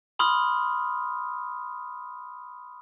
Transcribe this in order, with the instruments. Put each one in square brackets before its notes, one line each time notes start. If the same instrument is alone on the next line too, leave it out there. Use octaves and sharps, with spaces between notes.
[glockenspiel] B5 C6 D#6 F6